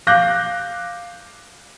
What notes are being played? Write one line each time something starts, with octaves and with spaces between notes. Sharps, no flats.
F5 D6 F#6 G6 A#6